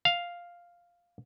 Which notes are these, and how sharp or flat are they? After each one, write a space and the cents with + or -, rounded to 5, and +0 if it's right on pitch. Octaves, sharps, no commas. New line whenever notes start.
F5 +0